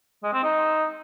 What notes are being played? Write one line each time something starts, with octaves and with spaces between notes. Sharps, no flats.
G#3
C4
D#4